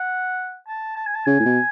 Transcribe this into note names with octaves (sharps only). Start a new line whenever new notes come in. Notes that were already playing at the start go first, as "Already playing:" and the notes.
Already playing: F#5
A5
A5
G#5
A5
C#3 G#5
A2
B2